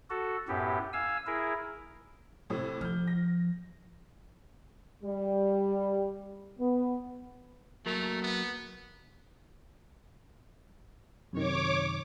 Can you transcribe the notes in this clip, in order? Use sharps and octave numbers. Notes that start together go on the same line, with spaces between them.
F#4 A4
F#2 A2 B3 G4
F5 G#5 E6
E4 G#4 A#4
A2 C3
F3 F6 G6
A#6
G3
B3
F#3 A3 A#3 A#4
B3
F#2 C3 D#3 C#5 D6